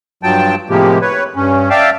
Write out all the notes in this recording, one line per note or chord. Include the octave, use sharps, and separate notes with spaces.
G2 F3 F#3 G5 A5
A2 C3 F3 G#3 A#3 G4
B4 C#5
G2 C#4
D5 E5 F5 G5 A5